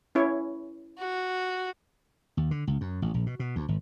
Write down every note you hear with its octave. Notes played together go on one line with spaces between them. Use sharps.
C#4 E4 C#5
F#4
D#2
D3
C#2
F#2
A1
A#1
B2
B2
D2
G#1